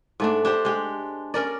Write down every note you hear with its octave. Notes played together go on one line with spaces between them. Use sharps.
G#2 A3 D4
D4 G4 C5
G#3 G4
C#4 A#4 D5